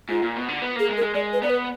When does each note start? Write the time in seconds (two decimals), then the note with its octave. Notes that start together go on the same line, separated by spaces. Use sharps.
0.09 G#2 F4
0.23 A#2
0.36 B2
0.48 D3
0.62 B3
0.76 A#3 G#4
0.89 G#3
0.97 A#4
1.02 G#3
1.15 G#3 D5
1.33 B4
1.42 B3 D5
1.50 B4